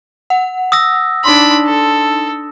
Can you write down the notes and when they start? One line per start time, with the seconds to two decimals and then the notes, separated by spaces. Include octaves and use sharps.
0.30 F#5
0.72 D#6 E6 A#6
1.25 D4 D#4 B5 C6
1.66 A4